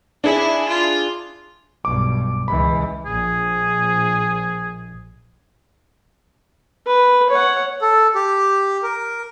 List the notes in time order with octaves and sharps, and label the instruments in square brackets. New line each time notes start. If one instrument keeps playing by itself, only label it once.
[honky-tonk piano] D4 G#4 [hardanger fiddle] E4
[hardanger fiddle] F4
[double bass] B1 G2 [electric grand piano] D6
[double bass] C#2 E3 [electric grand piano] B5
[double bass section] A#1 [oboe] G#4
[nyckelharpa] B4
C#5 F#5
[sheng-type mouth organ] A4
G4
A#4